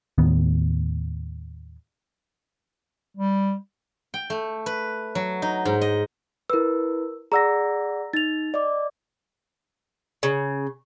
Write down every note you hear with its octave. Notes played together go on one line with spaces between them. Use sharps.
D#2 A2 D#3 B3
G3
G5
A3
B4
F#3
D#4
G#2
D#5
E4 A#4 B4 E6
G#4 D5 F#5 A#5 E6 A#6
D#4 A6 F7
D5 D#5 D6
C#3